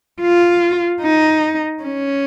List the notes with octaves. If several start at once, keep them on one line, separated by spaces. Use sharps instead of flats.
F4
D#4
C#4